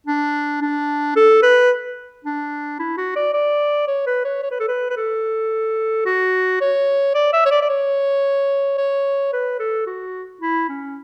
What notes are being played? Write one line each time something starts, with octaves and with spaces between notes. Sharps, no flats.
D4
D4
A4
B4
D4
E4
F#4
D5
D5
C#5
B4
C#5
C#5
B4
A4
B4
B4
A4
F#4
C#5
D5
E5
C#5
D5
D5
C#5
C#5
B4
A4
F#4
E4
C#4